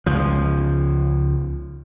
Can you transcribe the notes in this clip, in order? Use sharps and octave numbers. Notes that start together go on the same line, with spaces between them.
C#2 F3